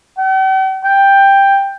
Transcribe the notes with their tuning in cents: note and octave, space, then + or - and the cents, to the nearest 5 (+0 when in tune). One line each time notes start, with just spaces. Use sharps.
G5 -45
G5 +5